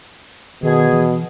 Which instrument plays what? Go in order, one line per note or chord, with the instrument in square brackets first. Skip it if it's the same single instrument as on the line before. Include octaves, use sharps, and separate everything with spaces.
[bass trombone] B2 [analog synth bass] D#3 [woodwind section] G#4
[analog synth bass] E3